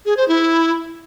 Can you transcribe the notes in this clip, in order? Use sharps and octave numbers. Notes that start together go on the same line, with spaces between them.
G#4
C5
E4